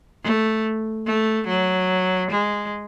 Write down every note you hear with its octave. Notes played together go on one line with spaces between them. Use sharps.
A3
A3
F#3
G#3